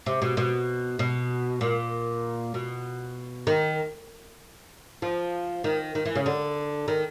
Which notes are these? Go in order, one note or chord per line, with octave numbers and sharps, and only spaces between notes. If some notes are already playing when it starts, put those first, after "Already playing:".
C3
B2
B2
B2
A#2
B2
D#3
F3
D#3
D#3
E3
C#3
D3
D#3